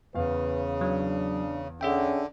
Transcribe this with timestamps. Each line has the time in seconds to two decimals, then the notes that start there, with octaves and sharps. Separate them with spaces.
0.15 E2 C#3 B4 F5
0.81 F#3 D4
1.81 D3 C#4 G#4 E5 G5